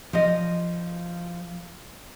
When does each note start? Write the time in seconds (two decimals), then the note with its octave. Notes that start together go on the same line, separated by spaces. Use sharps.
0.13 F3 D#5